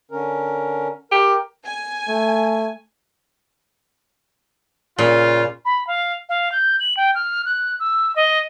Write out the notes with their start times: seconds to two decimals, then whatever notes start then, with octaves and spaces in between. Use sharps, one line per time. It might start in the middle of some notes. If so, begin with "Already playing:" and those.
0.11 D3 C#4 A#4
1.12 G4 A#4
1.64 G#5
2.08 A3
4.98 A#2 C#3 F4
5.65 B5
5.87 F5
6.29 F5
6.52 G6
6.80 F#7
6.97 G5
7.15 F6
7.45 F#6
7.80 E6
8.16 D#5